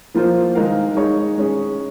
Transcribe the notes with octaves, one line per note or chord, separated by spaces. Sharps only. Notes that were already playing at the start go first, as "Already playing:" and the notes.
F3 A#3 F4 C5
D#3 G#3 D#4 A#4 F5
G#3 D#4 G#4 C#5
G#3 C#4 G#4